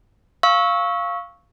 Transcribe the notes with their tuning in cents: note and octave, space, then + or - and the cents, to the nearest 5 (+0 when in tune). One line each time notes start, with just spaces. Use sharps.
F5 -5 C#6 +0 E6 -20